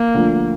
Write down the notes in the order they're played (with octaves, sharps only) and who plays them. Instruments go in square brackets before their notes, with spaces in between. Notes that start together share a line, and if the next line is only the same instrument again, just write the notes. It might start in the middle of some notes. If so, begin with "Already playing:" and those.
Already playing: [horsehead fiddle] A#3
[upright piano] D2 D3 F3